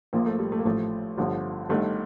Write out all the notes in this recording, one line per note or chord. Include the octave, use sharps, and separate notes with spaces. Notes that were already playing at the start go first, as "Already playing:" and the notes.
A#1 A#2 F3 A#3
A3
G3
A3
A#3
A1 A2 F3 A3
G1 G2 D3 F3
G1 G2 D#3 A3